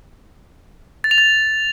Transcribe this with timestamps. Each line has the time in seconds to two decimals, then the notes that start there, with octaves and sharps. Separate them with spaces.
1.04 A6
1.11 F7
1.18 A6